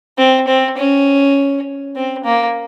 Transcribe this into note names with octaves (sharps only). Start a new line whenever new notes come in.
C4
C4
C#4
C4
A#3